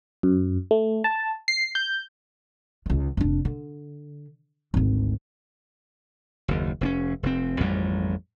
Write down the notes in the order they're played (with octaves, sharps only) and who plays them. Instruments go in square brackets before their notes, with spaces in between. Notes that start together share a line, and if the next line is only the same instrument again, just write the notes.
[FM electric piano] F#2
A3
A5
C7
G6
[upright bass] C#2 D#3
F1 D4
D3
G#1 D2
[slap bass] F#1 D#2
F1 C4 C#4
F1 C4
A1 F2 G#2 G3